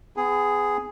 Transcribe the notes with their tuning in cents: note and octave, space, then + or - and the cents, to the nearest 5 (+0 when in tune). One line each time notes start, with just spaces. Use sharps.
B3 +35 G#4 +0